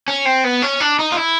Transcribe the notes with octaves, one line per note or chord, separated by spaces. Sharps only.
C#4
C4
B3
C#4
D4
D#4
F4
E4